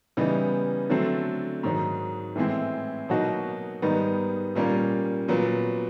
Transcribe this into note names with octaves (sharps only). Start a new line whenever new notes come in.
C#3 E3 G3 B3 D#4
D3 F#3 A3 C4
G#2 D#3 F#3
A2 E3 G#3 C4 E4
B2 F#3 A#3 D#4 F#4
G#2 D#3 G3 B3 D#4
A#2 G3 A#3 C#4
A#2 F#3 B3